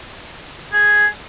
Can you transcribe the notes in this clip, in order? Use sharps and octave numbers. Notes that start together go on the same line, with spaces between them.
G#4